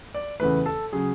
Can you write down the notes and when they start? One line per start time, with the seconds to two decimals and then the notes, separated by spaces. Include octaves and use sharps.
0.14 D5
0.40 E2 C#3 E3 A3 B4
0.66 A4
0.93 C#3 F#3 G#4